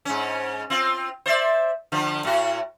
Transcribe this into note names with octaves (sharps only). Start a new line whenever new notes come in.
G#2 C#4
C4 F4
C5 D5 E5
D3 F3
A2 F#4